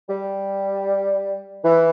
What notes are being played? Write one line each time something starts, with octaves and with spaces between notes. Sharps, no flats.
G3
E3